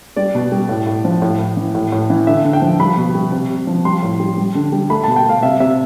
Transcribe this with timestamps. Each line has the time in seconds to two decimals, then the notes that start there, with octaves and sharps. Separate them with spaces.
0.16 G3 D5
0.35 B2
0.52 G3
0.69 A2
0.87 A2
1.05 F3
1.22 A2
1.39 A2
1.57 E3
1.75 A2
1.92 A2
2.10 E3
2.27 D3 E5
2.44 D3
2.53 G5
2.62 F3
2.79 G3 B5
2.97 B2
3.15 G3
3.32 C3
3.50 C3
3.67 F3
3.85 G3 C6
4.03 A2
4.20 G3
4.37 G3
4.55 D3
4.72 G3
4.90 A3 B5
5.03 A5
5.08 B2
5.16 G5
5.25 A3 F5
5.43 C3 E5
5.60 C3 E5